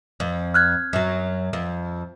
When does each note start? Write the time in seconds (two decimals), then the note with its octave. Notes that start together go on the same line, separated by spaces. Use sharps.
0.20 F2
0.54 F6 F#6 G#6
0.93 F#2 F#3
1.53 F2